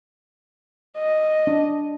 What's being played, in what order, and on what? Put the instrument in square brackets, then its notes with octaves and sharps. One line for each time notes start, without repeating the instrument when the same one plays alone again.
[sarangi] D#5
[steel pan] D4